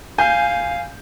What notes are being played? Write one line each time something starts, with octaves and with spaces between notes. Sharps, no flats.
F5 G#5 G6